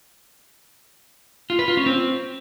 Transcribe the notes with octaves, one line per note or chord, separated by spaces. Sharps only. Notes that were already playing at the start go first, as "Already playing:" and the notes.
F4
B4
F4
C#4
C4